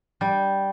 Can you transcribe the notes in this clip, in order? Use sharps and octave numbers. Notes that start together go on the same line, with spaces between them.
G3